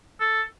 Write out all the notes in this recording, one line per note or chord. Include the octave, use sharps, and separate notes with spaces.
A4